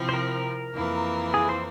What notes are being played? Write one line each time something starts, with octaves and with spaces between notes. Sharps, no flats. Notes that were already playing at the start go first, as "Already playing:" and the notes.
Already playing: C3 F3 C4 E4
C5
A#4
F2 E3 A#3 E4
G#4
C5